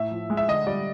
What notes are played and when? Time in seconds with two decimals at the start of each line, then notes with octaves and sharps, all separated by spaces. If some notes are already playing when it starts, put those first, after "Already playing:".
Already playing: A2 E5
0.11 F3
0.30 G#3
0.37 E5
0.48 D3 D#5
0.67 G3 D5